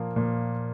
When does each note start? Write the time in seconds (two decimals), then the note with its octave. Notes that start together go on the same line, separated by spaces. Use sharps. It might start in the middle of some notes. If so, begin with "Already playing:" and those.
Already playing: A#2 F3 A#3
0.16 A#2 F3 A#3